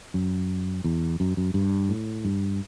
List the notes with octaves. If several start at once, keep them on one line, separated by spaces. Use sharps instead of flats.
F#2
E2
F#2
F#2
G2
A2
G2